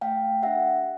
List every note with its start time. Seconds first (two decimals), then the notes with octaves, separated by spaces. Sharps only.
0.01 A3 F5 G5
0.43 D4 G4 E5 F#5